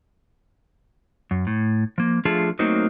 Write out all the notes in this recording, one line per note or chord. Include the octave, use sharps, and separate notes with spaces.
F#2
A2
F3 A#3
F3 A3 D4 F4 G#4 A5
F#3 A3 A#3 C4 D#4 F#4